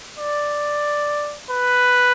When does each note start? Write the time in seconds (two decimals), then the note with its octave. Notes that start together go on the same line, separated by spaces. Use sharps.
0.18 D5
1.51 B4